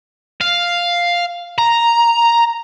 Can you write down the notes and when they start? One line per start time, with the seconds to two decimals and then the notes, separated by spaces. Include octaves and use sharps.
0.41 F5
1.58 A#5